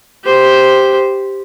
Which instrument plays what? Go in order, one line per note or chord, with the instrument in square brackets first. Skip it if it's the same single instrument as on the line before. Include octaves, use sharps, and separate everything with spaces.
[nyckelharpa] G4 C5